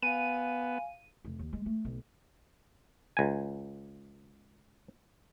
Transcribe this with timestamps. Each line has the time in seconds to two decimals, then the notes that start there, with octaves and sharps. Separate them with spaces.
0.02 B3 F5 G#5 D#7
1.25 F1
1.39 D#2
1.53 G#3
1.66 A3
1.85 B1
3.17 C#2 G#5